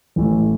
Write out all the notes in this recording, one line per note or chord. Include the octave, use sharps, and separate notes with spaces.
A1 A2 E3 A3